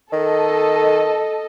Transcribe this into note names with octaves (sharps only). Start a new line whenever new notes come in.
D#3 A4 D#5